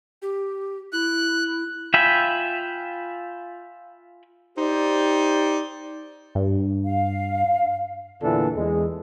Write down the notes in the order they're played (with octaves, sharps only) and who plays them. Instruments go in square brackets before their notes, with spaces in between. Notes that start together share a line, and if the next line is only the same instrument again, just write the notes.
[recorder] G4
[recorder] E4 [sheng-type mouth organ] F#6
[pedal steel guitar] F4 E5 G5 G#5 B5
[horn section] D#4 G4 C5 D5
[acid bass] G2
[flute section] F5
[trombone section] E2 A#2 D3 E3 D4 A4
E2 G#3